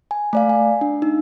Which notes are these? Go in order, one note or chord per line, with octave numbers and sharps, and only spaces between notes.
G#5
A3 D5 F5
G#5
D4
D#4